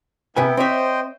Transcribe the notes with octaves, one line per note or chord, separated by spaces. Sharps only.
C3 B3 E4 B4 G5 G#5
C4 C5 C#5 D#5 E5 G5